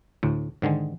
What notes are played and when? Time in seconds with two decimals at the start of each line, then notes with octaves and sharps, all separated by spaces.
0.23 D2 A2
0.62 G#2 D3 D#3 G#3